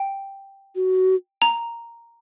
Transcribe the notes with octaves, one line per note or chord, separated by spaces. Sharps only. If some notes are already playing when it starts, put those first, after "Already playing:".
Already playing: G5
F#4
A#5